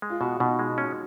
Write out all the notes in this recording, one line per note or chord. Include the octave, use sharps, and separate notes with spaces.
G#3
F4
B2 F#4
B2 D#4
G#3
C#4